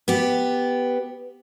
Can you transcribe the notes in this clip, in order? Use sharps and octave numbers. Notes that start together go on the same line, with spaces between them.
B3 G4